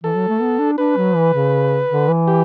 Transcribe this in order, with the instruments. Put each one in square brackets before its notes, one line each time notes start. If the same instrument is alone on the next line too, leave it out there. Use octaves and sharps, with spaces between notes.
[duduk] E3 [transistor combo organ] A4
[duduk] F#3
A3
B3
D4
[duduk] D4 [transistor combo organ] B4
[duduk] F#3
E3
C#3
D3
E3
[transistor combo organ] G4